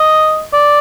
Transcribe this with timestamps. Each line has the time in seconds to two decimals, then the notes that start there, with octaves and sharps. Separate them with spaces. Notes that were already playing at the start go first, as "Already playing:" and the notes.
Already playing: D#5
0.53 D5